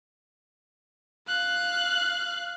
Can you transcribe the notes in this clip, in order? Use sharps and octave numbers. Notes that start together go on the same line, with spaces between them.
F5 F#6